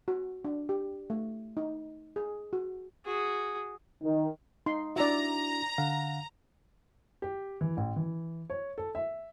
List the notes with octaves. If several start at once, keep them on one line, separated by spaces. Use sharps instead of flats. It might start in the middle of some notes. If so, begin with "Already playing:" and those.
F#4
D4
G4
A3
D#4
G#4
F#4
F#4 G#4
D#3
D#4 C6
D4 E4 F#4 D5 E5 A#5
D3 F5 F#5
G4
E3
A1
E3
C#5
A4
E5